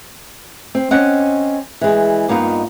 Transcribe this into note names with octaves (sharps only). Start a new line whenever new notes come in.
C4
C4 C#4 D#5 F#5
E3 G#3
G2 A#3 B3 D#4 F4